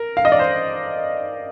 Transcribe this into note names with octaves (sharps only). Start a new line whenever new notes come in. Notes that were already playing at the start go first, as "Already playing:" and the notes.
Already playing: A#4
F5
D#5
D5
C5